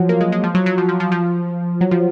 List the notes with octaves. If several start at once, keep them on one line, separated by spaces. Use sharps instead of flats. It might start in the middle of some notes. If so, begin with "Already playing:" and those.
Already playing: F3 F#3
A#3
G#3
G#3
F3
F#3
F#3
F3
F3
F3
F3
F#3
F3